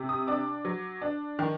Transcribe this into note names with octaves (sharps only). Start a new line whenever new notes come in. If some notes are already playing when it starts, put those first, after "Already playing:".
Already playing: C3
D#6
D4 D6
F#3
D4
D#3